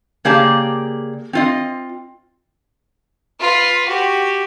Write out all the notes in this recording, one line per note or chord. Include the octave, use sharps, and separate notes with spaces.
C#3 A#3 G4 G#4 D5 A5
C4 F4 D#5
F4 B4
F#4 G4